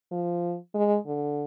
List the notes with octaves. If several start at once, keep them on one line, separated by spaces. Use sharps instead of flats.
F3
G#3
D3